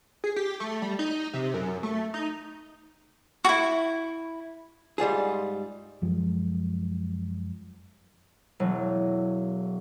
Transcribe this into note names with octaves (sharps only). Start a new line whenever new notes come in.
G#4
G4
A3
G3
D#4
C3
F#2
A3
D#4
E4 F#4
G#2 G3 F4 G#4
F#2 F3 G#3
E1 F#3